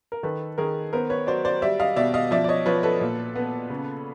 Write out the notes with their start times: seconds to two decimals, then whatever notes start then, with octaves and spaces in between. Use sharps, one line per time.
0.12 A#4
0.23 D#3 A4 B4
0.58 D#3 G#4 A#4
0.93 B3 A#4 C5
1.10 B4 C#5
1.27 F#3 C5 D5
1.45 C5 D5
1.62 G3 D5 E5
1.80 D#5 F5
1.96 B2 D5 E5
2.14 D#5 F5
2.31 F3 D5 E5
2.44 D5
2.48 C#5 D#5
2.66 F3 B4 C#5
2.83 A4 B4
3.01 A#2
3.35 B3
3.70 C#3